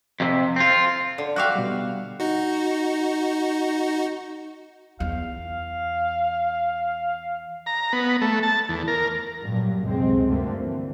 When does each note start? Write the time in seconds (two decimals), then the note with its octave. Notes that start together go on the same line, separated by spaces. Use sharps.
0.20 F2 C3
0.56 C4 F4
1.18 D3
1.36 F#4 E5 F5 G5 D6 F#6
1.55 B2 G3
2.20 D#4 F#4
5.00 E2 F5
7.66 A#5
7.93 B3
8.22 A3
8.43 A5
8.69 E2
8.88 A#4
9.42 G2 A#2 F#3
9.84 C#2 F#2 C3 G#3 C4
10.26 D2 G2 D3 A3 A#3 C4
10.62 E3